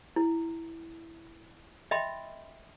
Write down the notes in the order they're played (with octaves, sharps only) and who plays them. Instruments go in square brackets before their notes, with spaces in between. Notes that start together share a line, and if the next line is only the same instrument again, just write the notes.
[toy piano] E4
D#5 E5 G5 B5 C6